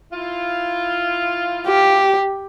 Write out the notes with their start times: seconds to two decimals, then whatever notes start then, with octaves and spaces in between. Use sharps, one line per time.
0.12 E4 F4
1.67 G4